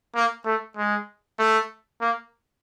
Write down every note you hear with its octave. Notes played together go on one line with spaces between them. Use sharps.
A#3
A3
G#3
A3
A#3